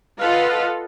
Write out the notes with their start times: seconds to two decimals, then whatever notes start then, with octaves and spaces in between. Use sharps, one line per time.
0.21 F4 A4 B4 D#5 F5 F#5